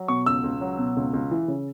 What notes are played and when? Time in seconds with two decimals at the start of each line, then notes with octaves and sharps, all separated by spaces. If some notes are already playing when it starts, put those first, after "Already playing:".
Already playing: F#3
0.08 B2 C#6
0.26 C#2 E6
0.44 C#2
0.61 F#3
0.78 B2
0.97 C#2
1.13 C#2
1.31 E3
1.48 C#3